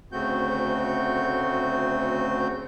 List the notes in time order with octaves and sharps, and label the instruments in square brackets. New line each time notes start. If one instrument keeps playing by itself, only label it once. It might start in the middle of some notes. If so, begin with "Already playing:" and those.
[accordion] D2 C#3 A3 C4 F#4 G6